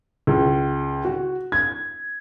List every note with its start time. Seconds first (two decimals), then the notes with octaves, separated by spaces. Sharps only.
0.27 C#2
1.05 F#4
1.52 G#6